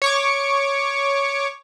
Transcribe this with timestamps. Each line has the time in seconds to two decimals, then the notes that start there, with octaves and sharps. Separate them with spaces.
0.02 C#5 C#6 D6